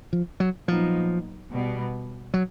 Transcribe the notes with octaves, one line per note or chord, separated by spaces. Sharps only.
F3
F#3
A#2 F3 F#3 B3 D#4
B2 G3 B3
F#3